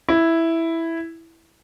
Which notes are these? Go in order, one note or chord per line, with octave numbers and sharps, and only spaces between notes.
E4